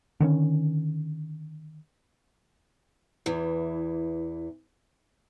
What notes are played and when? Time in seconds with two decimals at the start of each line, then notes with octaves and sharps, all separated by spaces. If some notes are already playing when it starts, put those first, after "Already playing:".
0.20 D3 D#3 C4 C#4
3.26 E2 E3